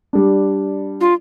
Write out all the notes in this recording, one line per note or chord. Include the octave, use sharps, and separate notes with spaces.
G3 D4
F4